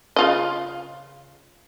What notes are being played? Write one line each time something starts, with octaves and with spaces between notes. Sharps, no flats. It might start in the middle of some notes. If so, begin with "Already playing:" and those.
C#3 F4 D#5